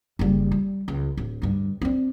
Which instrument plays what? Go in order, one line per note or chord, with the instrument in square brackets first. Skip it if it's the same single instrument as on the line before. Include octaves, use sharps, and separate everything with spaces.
[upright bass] F#1 G3
G3
C#2
D1
D2 G2
C4 D4